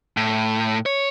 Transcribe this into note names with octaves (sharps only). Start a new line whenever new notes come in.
A2
C#5